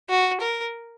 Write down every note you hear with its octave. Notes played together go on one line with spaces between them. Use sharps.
F#4
A#4